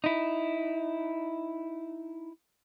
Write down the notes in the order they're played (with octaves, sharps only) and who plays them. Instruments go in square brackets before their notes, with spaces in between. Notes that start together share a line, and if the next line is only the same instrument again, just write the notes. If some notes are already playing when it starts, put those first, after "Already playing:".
[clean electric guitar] D#4 E4